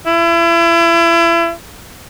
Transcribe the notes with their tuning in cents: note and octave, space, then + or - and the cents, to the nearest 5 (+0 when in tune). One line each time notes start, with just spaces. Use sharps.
E4 +35